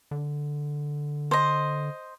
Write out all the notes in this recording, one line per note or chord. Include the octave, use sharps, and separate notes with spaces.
D3
C5 D#5